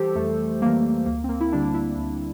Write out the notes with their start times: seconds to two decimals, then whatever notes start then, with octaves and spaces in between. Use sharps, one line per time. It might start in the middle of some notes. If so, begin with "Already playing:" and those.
Already playing: E3 G3 G4 A4 C5
0.15 F2 A3
0.62 E3 G3 A#3
1.06 D2 A#3
1.24 C4
1.29 A#3
1.40 E4
1.52 D3 G3 D4
1.74 E4
1.97 D2